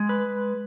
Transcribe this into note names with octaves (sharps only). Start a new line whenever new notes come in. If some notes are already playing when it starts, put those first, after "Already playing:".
Already playing: G#3
B4